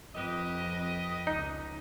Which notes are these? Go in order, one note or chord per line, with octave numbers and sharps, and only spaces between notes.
F2 G4 B4 D#5
C#2 D#4